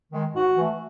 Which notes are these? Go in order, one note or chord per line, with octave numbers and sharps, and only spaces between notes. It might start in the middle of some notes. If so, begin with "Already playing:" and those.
D#3 G#3
G#2 F#4
E3 A3